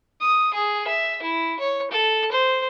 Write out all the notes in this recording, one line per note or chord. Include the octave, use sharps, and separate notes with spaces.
D#6
G#4
E5
E4
C#5
A4
C5